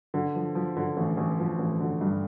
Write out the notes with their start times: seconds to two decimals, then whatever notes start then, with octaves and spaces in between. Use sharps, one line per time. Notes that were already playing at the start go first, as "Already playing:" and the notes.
0.14 D3
0.35 F3
0.55 F3
0.76 D3
0.97 A1
1.17 A1
1.39 F3
1.59 A1
1.80 D3
2.01 G2